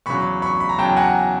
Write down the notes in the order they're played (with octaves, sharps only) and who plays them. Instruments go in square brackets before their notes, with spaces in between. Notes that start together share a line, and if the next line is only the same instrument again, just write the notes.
[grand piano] E2 C#3 F#3 B5 C#6
B5 C#6
B5
A#5
E2 C#3 F#3 G5 A5
F#5 G#5